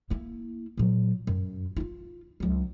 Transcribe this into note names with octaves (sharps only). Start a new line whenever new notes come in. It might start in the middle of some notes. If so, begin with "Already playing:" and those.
A#3 E4
A#2 F#3
F#2
E4 F4
C#2 F#3